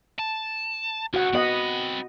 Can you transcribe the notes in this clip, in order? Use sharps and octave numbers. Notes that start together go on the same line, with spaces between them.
A5
C#2 F#4 F#5
B3 C4 D#5 F#5 B5